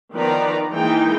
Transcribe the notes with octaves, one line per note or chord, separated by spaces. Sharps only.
D#3 F3 B3 B4 D5 A#5
E3 G#3 A#3 D#4 G5